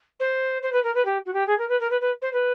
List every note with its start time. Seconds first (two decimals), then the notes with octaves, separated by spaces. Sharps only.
0.20 C5
0.62 C5
0.72 B4
0.83 A#4
0.95 B4
1.05 G4
1.26 F#4
1.33 G4
1.47 G#4
1.58 A#4
1.69 B4
1.80 A#4
1.90 B4
2.01 B4
2.22 C5
2.33 B4